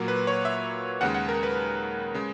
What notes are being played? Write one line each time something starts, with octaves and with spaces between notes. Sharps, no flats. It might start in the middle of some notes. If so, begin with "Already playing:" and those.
Already playing: A#2 F#3 A#3
B4
C#5
E5
D#2 C#3 G#3 F#5
F#5
A#4
B4
C#3 G#3